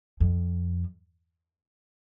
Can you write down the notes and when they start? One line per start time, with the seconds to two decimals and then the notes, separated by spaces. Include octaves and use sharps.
0.20 F2